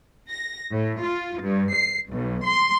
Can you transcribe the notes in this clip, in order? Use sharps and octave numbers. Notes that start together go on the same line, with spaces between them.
A#6
A2
F4
G2
C7
B1
C6